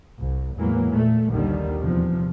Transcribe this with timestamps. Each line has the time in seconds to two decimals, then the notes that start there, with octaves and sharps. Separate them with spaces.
0.22 C2
0.57 E2 A2 E3 F#3 G#3 A#3
0.91 A#2 A3
1.30 A#1 D#2 D3 D#3 G3
1.81 E2 C3 F3